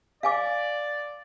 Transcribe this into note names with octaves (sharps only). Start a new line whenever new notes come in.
D5 F5 G#5 D6